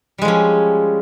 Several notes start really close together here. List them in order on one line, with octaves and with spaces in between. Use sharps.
G3 G#3 F3 C#4